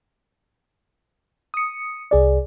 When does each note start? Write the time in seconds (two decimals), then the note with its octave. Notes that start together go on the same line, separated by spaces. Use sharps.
1.54 D#6 C#7
2.11 C2 G#4 D5